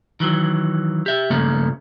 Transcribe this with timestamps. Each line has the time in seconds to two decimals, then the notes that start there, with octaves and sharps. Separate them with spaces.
0.20 D#3 E3 F#3
1.06 G4 E5
1.30 C#2 G2 C#3 F3 A3 A#3